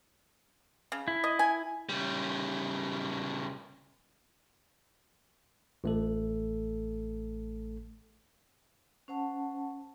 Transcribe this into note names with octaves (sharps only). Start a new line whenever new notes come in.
C#3
E4
D#5
G#5
C#3 G3
A1 A3 A4
C#4 C5 F#5 A5